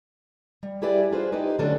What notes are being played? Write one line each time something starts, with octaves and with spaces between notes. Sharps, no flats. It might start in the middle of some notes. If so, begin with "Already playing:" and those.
G3
E4 G4 G#4 B4 D5 E5
D4 F4 G#4 B4 C5
D#4 G4 B4 D#5
D3 F#3 A3 C#4 D4 A4